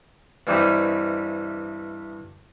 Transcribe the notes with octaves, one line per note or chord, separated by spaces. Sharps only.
G2 C3 E3 G3 C4 D#4